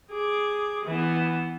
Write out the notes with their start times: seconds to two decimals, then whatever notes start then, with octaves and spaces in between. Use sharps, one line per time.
0.12 G#4 D6
0.86 E3 B3